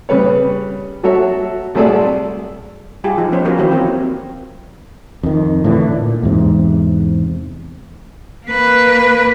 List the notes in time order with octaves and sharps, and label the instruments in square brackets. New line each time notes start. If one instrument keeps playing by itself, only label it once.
[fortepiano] C#3 G3 B4 C#5
F#3 F#4 A4 C#5 E5
C2 F#3 A3 G#4 A4 D5
[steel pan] G3 F4 G4 G#4
F3 D#4 F4
F3 B3 C#4 C5 C#5
A#3 B3 C#4 F#4 A#4 C5
D#3 E3 F#3 E4 G4 C5
C4 F4 A#4 C#5
[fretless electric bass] F2 D#3
A2 D3 E3
A#2
E2 G#2 C3
[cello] A#3 B4